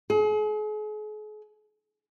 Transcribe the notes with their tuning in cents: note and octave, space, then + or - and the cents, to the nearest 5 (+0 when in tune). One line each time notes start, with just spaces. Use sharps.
G#4 +40